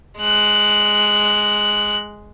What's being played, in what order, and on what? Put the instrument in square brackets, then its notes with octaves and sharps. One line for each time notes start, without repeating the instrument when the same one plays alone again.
[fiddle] G#3 F#6